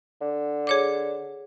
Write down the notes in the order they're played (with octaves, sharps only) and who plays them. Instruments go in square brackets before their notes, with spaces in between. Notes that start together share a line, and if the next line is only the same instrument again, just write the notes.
[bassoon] D3
[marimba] G#4 C#5 D6